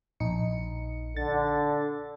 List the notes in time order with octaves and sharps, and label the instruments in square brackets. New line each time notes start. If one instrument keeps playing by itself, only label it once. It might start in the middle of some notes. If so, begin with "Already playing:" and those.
[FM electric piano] A#1 D#4 C#7
[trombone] D3 [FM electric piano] A6